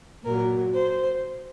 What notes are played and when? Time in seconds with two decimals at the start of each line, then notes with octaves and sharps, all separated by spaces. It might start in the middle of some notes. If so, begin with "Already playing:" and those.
0.24 A#2 F#3 A#4
0.75 C5